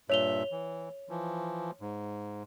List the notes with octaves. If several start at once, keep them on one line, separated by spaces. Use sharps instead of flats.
G2 A#2 C#5 E5 F7 G7
E3
E3 F3
G#2